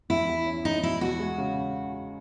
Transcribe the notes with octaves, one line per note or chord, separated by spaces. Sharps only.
E2 E4
E2
C#4
G#3 D#4
B2 E4
E2 F#4
G#3
C#3